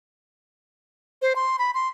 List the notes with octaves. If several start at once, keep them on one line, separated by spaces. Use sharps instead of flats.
C5
C6
B5
C6